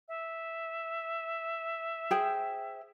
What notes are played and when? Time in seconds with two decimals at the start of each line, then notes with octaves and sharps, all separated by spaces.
0.08 E5
2.11 G#4 C5 G5